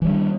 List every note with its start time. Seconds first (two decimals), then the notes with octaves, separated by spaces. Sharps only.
0.02 E3
0.05 G3
0.08 D4
0.11 D#3